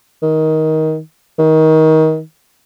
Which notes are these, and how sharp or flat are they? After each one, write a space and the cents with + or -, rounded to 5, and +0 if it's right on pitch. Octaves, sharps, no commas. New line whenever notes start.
D#3 +15
D#3 +25